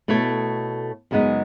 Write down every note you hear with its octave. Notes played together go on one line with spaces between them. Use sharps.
B2 A3 E4 A4 C#5
F#2 C#3 G#3 B3 D#4